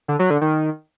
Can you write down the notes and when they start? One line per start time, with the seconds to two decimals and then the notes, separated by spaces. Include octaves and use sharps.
0.08 D3
0.19 F#3
0.30 D3
0.41 D#3